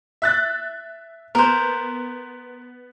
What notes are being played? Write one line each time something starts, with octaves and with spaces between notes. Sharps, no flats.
E5 F#6 A6
B3 A#4 C5